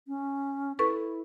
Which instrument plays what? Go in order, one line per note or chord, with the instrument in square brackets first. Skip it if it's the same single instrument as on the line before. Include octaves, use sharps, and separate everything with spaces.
[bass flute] C#4
[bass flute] E4 [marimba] A4 B4 C#6